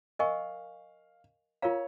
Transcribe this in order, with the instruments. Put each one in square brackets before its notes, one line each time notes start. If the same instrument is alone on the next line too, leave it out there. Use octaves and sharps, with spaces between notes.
[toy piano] A#4 D#5 G#5 C#6 [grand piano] F5
[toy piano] F4 A#4 F5 A#5 [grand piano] C#5